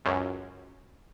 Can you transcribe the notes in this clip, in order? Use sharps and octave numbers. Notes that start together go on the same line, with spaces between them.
C#2 F#2